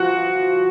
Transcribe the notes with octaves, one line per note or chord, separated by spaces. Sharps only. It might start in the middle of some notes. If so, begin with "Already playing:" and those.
Already playing: F3 F#4 F#5